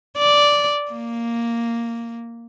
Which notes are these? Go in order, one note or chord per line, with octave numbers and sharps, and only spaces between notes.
D5
A#3